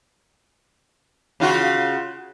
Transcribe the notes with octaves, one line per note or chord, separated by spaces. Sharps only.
C#3 F4 F#4